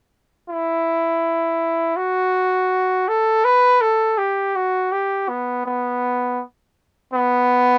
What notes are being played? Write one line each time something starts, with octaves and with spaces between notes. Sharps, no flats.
E4
F#4
A4
B4
A4
G4
F#4
G4
B3
B3
B3